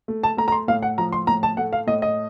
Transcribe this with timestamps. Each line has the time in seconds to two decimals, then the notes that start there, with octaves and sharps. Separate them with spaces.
0.08 A3
0.23 A5
0.37 A3 A#5
0.48 A#5
0.52 C6
0.68 A2 F5
0.83 F#5
0.98 F3 A#5
1.12 C6
1.27 A2 A#5
1.43 A5
1.57 A3 F#5
1.73 F5
1.87 A2 D#5
2.02 D#5